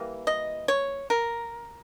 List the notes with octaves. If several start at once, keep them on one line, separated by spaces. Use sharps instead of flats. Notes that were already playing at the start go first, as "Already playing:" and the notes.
Already playing: E3 G3 A#3
D#5
C#5
A#4